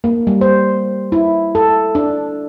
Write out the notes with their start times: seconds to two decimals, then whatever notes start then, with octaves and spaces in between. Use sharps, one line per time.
0.04 A#3
0.27 G3
0.41 C5
1.12 E4
1.55 A4
1.95 D4